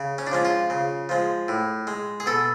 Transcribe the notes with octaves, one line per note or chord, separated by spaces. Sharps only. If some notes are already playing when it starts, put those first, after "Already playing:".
Already playing: C#3
C#4
D4
F3 G#3 C#4
F4
C#3
F3 G#3
A2
G#3
G#4
B2 A4